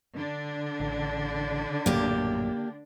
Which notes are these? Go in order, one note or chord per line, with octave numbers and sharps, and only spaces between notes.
D3 D4
A1
A#1 F#2 A2 A#3 G4